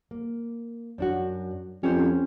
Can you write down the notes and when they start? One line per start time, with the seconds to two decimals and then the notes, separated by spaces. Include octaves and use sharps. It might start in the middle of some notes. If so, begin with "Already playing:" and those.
0.11 A#3
0.98 F#2 D4 F#4
1.83 F2 C#4 G4 C5